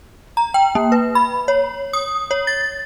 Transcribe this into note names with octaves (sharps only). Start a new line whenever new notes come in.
A#5
G5
A#3
B4
B5
C#5
D#6
C#5
A6